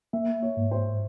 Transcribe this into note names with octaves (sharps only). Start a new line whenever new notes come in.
A#3 E5
C#5
G#2
C5